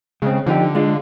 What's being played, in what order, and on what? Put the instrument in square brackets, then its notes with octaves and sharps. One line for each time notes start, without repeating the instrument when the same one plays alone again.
[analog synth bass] C#3 [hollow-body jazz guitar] G#3 C4
[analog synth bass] D3 [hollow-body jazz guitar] F3 D#4 G4
[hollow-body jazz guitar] G#3 D4 F4